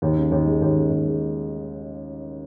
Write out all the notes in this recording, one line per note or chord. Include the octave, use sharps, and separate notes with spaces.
D#2
C#3
D#2
G#3
D#2
C#3
D#2
G#3